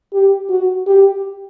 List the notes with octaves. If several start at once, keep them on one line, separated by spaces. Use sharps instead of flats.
G4
F#4
G4